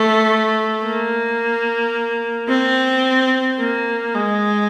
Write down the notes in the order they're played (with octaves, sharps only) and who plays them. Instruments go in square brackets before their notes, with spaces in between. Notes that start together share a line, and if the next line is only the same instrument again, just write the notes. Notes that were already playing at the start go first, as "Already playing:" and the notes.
Already playing: [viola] A3
A#3
C4
A#3
G#3